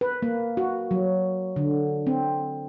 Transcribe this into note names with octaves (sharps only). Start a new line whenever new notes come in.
B4
A#3
F#4
F#3
D3
C4